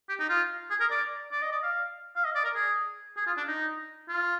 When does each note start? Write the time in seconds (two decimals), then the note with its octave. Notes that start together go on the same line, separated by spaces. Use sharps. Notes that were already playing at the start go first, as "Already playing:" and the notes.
0.09 G4
0.20 D#4
0.29 F4
0.70 G#4
0.80 A#4
0.91 D5
1.32 D5
1.42 D#5
1.52 D5
1.63 F5
2.16 F5
2.25 D#5
2.35 D5
2.44 A#4
2.55 G#4
3.17 G#4
3.27 F4
3.37 D4
3.48 D#4
4.09 F4